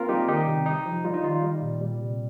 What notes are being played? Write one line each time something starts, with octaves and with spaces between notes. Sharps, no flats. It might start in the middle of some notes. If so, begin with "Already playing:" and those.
Already playing: A#3 C4 F4 A#4
G3 D#4 G4
D#3 D#4 G4
C3
D#4
F3
G3 F4
D#4
D#3 F4
G3
A#2
G3
C3